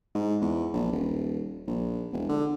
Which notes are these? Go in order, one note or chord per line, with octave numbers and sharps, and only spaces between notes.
G#2
E2
A#1
D#1
A#1
E1
D3